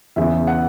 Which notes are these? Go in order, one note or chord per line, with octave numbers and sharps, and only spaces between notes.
E2 C#3 E3 B3 E5
F#5